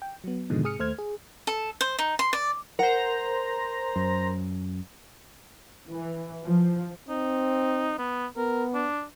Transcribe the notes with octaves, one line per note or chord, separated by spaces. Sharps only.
G5
F#3 B3
G#2 B2 D3 D#3 F3 G#3
G#2 C3 G#4 D#6 F6 C#7
D#2 A3 C5 F6 G#6
G#4
A4
C5
D#4
C6
D5
A#4 C5 F#5 A#5
F#2
E3
F3
C4 D#4
B3
B3 A#4
D4